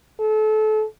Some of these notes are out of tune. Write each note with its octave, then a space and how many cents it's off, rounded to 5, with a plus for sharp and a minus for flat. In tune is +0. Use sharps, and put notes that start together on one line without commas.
A4 -30